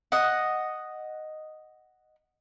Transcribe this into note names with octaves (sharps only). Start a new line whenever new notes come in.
D#5 F#5